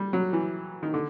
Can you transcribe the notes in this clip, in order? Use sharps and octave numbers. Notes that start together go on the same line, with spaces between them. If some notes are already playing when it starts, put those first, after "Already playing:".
Already playing: G3
F#3
E3
D#3
D3